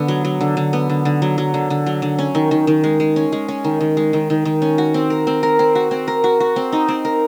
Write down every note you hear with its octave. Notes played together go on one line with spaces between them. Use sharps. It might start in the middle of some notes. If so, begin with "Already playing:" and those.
Already playing: D3 B3
F#3
F#3
D3
D3
B3
D3
D3
F#3
F#3
D3
D3
F#3
D3
C#4
D#3
D#3
D#3
G#3
G#3
C#4
G#3
C#4
D#3
D#3
G#3
D#3
D#3
D#3
C#4
F#4
C4
A#4
C4
A#4
C4
F#4
C4
A#4
F#4
F#4
C4
D#4
C4
A#4